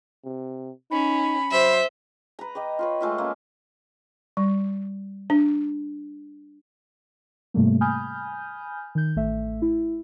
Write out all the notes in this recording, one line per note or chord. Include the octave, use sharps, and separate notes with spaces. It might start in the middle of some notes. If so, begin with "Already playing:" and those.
C3
C#4 D#4 B5
F#3 C5 E5
B4 A#5
D#5 G5 D6
F4 B4 C#5
G#3 A3 F4 E5
A#3 C#4
G3
D4
G#2 C3 G3 A3 A#3
G#5 B5 D#6 F6 G6
D#3 G6
A1 A3 E5
E4